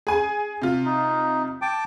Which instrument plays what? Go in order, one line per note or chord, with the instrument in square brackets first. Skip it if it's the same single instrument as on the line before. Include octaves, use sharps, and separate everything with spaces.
[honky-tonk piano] G#4 G#5
C3 F4
[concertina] D#4
G5 A5 D6